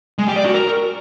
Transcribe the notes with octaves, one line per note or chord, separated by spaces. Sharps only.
G#3
G4
D5
F#4
A#4